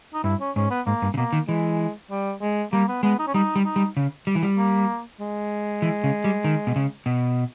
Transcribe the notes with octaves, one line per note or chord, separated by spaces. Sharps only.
D#4
G2 E4
C#4
G#2 C#4
B3
G#2 A#3
G2
C#3
B2 A#3
D#3
E3 G#3
G3
G#3
G3 A#3
B3
G#3 B3
D#4
C#4
G3 D#4
G3
D#4
G3
C#3
G3
E3
G3
A#3
G#3
E3
C#3
G3
D#3
B2
C#3
B2